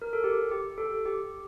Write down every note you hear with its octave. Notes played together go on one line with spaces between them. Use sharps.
A#4
A4
G4
G4
A4
G4